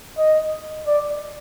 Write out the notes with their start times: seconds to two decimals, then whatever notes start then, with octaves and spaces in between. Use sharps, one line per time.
0.17 D#5
0.87 D5